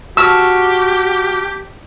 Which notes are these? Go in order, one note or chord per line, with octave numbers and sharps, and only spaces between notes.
F#4 G4 A5 C#6 E6 F6